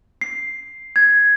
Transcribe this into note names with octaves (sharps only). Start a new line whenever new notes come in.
C7
G#6